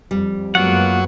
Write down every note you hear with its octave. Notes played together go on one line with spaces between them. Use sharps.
F2 G3
F#2 F#3 G#3 A#3 B3 F4 F#5